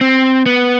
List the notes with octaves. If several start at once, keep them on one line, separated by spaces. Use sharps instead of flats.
C4
B3